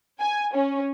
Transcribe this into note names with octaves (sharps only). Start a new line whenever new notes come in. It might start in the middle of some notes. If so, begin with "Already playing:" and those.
G#5
C#4